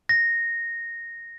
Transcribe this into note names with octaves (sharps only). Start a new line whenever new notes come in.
A#6